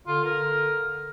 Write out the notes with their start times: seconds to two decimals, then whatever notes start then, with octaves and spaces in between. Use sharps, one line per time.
0.07 D3 F4
0.24 A#4